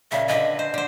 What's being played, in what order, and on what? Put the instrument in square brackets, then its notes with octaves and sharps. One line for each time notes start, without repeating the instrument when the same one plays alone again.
[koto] A#2 C#3 [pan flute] E5
[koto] D3 B4 G#5 [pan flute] D#5
[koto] C5
D3 C5